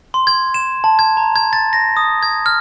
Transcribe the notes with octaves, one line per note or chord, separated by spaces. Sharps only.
C6
G#6
E7
A5
G#6
A#5
G#6
A6
A#6
D#6
G#6
F6